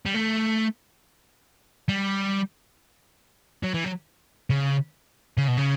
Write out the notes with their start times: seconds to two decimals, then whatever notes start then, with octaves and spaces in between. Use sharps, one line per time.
0.05 G3
0.14 A3
1.88 G3
3.63 F#3
3.74 E3
3.84 F#3
4.50 C#3
5.38 C#3
5.48 B2
5.57 C#3